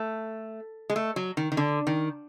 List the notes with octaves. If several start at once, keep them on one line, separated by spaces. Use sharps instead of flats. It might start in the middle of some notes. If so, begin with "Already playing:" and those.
Already playing: A3
G#3
A3
F#3
D#3
D#3
D3
D#3